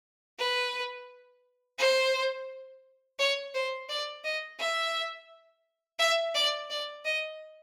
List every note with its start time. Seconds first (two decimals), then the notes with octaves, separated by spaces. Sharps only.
0.39 B4
1.79 C5
3.19 C#5
3.54 C5
3.89 D5
4.24 D#5
4.59 E5
5.99 E5
6.35 D5
6.70 D5
7.05 D#5